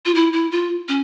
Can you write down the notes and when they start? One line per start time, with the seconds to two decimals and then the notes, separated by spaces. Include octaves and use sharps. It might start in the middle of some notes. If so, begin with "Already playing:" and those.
0.05 F4
0.15 E4
0.33 E4
0.51 F4
0.88 C#4